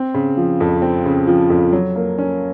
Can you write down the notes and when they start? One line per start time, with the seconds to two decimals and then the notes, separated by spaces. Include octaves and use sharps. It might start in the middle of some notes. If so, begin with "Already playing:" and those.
Already playing: C4
0.14 C#3
0.37 F3
0.60 F2
0.82 C4
1.05 C#3
1.27 F3
1.50 F2
1.72 F#3
1.95 A#3
2.18 C#4